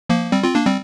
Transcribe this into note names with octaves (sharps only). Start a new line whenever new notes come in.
F3 A#3
G3 C4
C4 F4
A#3 D4
G3 C4